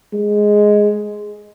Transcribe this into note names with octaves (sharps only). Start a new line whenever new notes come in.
G#3